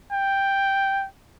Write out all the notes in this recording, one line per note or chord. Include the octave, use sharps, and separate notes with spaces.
G5